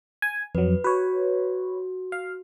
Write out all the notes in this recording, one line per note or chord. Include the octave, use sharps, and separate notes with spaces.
G#5
F2 F#3 B4
F#4 B4 C#5
F5